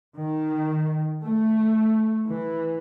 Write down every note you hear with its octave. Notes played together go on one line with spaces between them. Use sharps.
D#3
A3
E3